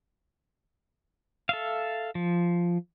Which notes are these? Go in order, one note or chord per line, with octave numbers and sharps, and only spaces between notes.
A4 E5 F5
F3